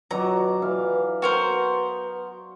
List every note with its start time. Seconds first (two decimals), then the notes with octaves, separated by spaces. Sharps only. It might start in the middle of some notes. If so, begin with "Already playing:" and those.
0.11 B2 F#3 D5 A#5
0.62 E3 F5
1.22 B3 F#4 A#4 C5